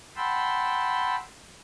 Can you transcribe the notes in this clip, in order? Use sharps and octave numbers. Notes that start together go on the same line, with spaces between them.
F#5 G5 A5 B5 C6 E6